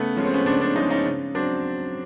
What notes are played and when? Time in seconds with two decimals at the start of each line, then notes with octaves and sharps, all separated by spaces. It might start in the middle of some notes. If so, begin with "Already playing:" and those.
Already playing: C#3 A3 B3
0.17 F3 G#3 C#4
0.26 C4
0.34 B3 C#4
0.46 C#3 C4 D4
0.61 C4 D4
0.76 F3 G#3 C#4 D#4
0.90 C#4 D#4
1.05 C#3
1.35 F#3 C4 D4